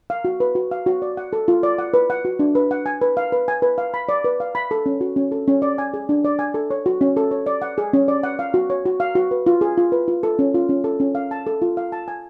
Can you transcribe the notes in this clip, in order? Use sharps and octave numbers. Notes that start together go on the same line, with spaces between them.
F5
F#4
B4
F#4
F5
F#4
D5
F#5
A4
F4
D5
F#5
B4
F#5
F#4
D4
B4
F#5
G#5
B4
F5
B4
G#5
B4
F5
B5
D5
B4
F5
B5
A4
C#4
F#4
C#4
A4
C#4
D5
G#5
G#4
D4
D5
G#5
A4
C#5
F#4
C#4
A4
C#5
D5
F#5
G#4
C#4
D5
F#5
F5
F#4
C#5
F#4
F5
F#4
B4
F4
G#4
F4
B4
F4
A4
C#4
F4
C#4
A4
C#4
F5
A5
A4
F4
F5
A5
G#5